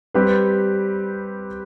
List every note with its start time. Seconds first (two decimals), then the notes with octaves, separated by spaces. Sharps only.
0.14 G3 C4 G4 B4